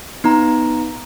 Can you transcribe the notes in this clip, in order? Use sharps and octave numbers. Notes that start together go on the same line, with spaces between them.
B3 D#4 A#5